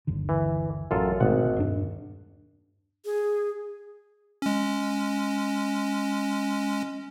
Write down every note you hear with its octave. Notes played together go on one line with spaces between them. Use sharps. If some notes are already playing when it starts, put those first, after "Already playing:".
G1 D#2 D3
E3
A1 F#2 F4 A4
G#1 B2 A3 F#5
D#1 G2 D4
G#4
G#3 C#4